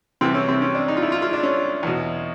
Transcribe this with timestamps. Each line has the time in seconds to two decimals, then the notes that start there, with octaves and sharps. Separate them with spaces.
0.21 C2 C3 E3 C4
0.34 C#4
0.48 C4
0.62 C#4
0.75 D4
0.88 D#4
0.97 F4
1.02 E4
1.12 F4
1.22 F4
1.33 D4
1.43 C#4
1.83 E2 B2